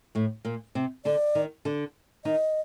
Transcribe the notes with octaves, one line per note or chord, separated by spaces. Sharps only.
A2 A3
A#2 A#3
C3 C4
D3 D4 D5
D#3 D#4
D3 D4
D#3 D#4 D#5